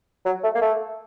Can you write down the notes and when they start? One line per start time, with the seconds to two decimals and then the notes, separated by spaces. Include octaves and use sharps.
0.26 F#3
0.43 A3
0.55 A#3
0.62 A3